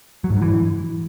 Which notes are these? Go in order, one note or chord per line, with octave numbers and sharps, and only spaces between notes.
F#3
G#2
G2
E3